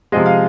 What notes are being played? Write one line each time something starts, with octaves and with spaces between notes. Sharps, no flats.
C3 F3 G#3 D#5
F5